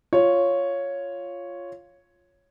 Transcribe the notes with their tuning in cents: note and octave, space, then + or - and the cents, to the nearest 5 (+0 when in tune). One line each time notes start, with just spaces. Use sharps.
F4 +0 C#5 +0